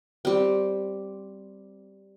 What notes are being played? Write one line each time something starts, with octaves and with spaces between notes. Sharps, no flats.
G3 C4